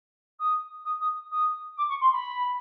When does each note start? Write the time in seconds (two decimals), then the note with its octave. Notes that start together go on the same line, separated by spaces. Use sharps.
0.39 D#6
0.84 D#6
1.00 D#6
1.31 D#6
1.77 D6
1.88 C#6
2.00 C6
2.12 B5